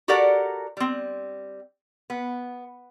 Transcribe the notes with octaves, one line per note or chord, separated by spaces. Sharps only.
F#4 G4 A4 A#4 D5 F#5
G3 C4
B3